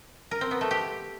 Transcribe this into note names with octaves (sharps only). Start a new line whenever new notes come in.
A#4
C4
B3
A3
G4